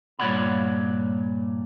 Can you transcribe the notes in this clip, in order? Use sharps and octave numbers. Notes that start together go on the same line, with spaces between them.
G2 A#2 C#5 D5 F#5 B5